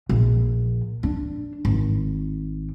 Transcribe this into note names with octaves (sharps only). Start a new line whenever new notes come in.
A#1
D4
G#1